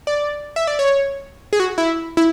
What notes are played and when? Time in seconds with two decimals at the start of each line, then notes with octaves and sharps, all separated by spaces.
0.07 D5
0.56 E5
0.67 D5
0.79 C#5
1.53 G#4
1.60 F#4
1.78 E4
2.17 E4